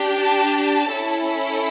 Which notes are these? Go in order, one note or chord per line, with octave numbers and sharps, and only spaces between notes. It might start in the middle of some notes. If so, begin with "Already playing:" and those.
Already playing: D4 G4
A5
C#4 E4 A4